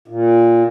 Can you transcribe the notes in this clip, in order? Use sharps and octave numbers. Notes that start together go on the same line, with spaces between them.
A#2